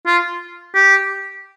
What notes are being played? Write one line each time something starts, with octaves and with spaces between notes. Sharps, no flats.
F4
G4